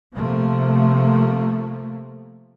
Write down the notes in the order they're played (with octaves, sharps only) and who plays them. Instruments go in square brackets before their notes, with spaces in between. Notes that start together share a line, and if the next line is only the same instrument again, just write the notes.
[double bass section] C3 F3 A3 A#3